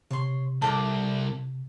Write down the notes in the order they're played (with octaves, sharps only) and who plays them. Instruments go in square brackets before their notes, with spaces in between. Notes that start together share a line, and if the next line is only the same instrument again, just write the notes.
[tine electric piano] C3 [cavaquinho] C#5 C6
[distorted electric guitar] C2 [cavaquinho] A4 D5